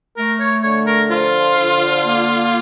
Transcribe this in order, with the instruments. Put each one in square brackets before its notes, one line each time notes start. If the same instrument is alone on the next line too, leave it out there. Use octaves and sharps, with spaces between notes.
[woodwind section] A3 [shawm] A#4
[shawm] C#5
[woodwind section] D3 [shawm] C#5
[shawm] A#4
[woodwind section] F3 [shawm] F4
[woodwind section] D3
A#3